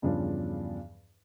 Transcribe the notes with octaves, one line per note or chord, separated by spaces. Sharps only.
E2 G2 C#3 F3 D4